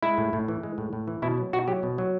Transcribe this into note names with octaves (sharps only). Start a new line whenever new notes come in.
G#3 E4
A2
A2
E3
G#3
A2
A2
E3
B2 E4
F#3
B2 F#4
F#3 G4
B2
F#3